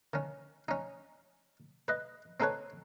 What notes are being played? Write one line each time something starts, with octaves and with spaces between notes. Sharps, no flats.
D#3 C#4
C#4 D#4
B4 D#5
C4 D#4 A4 B4 C#5